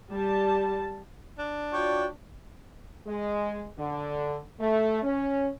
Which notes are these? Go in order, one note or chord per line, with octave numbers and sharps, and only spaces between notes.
G3 A5
D4
F4 F#4 C#5 D5 G5
G#3
D3
A3
C#4